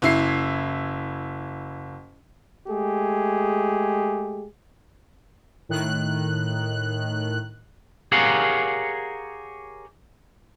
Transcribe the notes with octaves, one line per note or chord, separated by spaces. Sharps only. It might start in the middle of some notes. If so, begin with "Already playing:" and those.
F#1 E4 C7
G#3 A3 G4 G#4
A2 D#3 F#6
G4 G#4 A#4 C#5 F5 F#5